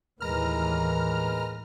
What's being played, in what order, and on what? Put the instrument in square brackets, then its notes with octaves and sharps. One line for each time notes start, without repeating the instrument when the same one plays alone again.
[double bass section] D#2 A2 E3 [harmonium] G#3 A#4 B4 [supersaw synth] A#5 F6